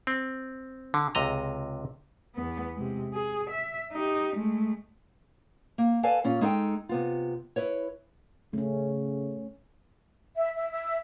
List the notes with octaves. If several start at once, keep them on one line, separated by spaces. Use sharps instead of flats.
C4
D3
C#2 C3 D#5 A#5
E2 B3
C3 G#3
G#4
E5
D#4 G4
G#3 A3
A#3
A4 B4 D5 F5 G#5 A5
A#2 C#4 F4
G#3 D#4 A4 F5 G5
C3 B3 F4
E4 B4 C#5
C#3 A3 C#4
E5
E5
E5